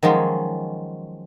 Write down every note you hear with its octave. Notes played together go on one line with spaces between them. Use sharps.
D#3 F3 F#3 G#3 C#4